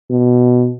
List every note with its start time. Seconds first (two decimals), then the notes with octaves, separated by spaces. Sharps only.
0.11 B2